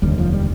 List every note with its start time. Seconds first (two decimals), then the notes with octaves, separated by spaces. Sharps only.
0.02 F1 D#2 D3 G3
0.18 F3
0.33 G3